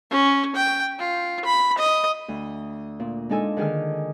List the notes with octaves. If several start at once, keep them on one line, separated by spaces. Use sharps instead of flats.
C#4
G5
F4
B5
D#5
D2
A#2
G#3 D4 D#4 A4 G#5
D3 D#3 G#4 G#5 F6